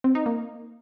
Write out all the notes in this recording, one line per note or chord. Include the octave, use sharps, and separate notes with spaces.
C4
D#4
A#3